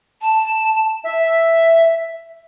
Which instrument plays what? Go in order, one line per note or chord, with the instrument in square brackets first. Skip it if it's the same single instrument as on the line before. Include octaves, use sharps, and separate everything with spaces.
[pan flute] A5
[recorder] E5